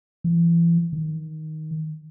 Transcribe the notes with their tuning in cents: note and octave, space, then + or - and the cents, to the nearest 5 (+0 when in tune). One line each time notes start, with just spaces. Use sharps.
E3 +35
D#3 +5